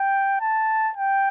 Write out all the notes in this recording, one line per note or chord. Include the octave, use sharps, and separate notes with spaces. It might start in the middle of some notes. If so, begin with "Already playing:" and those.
Already playing: G5
A5
G5